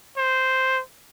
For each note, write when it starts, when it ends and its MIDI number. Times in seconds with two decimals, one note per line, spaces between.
0.18 0.81 72